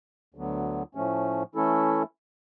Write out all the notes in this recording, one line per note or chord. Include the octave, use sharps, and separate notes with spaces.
D2 D3 F#3 B3
A2 F3 A3 C#4
E3 A3 C#4 E4 A4